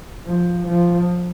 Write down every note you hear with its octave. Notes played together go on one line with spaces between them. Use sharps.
F3
F3